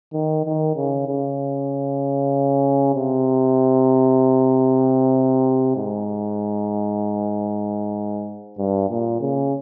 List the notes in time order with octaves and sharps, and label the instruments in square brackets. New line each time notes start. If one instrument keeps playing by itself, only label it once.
[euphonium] D#3
D#3
C#3
C#3
C3
G#2
G2
A#2
C#3